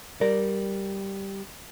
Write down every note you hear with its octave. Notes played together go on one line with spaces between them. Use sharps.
G3 A#4 D5